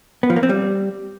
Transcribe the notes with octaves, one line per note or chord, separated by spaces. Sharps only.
B3
F3
A#3
C4
G3